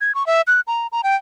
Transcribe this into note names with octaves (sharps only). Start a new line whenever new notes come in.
G#6
C#6
E5
F#6
A#5
A#5
G5